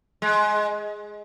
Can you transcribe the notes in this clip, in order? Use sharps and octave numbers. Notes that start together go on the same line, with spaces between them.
G#3